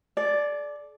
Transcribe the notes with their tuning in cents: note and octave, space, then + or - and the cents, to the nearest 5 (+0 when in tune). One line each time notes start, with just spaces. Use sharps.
A4 -45 D5 +0